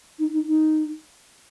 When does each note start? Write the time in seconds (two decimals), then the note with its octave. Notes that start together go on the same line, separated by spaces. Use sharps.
0.19 D#4
0.33 D#4
0.48 D#4